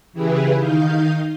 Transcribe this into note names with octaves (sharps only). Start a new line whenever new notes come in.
C#3 E3 E4 G4 G#4 B4
D#3 D#4 F5 D#6 G6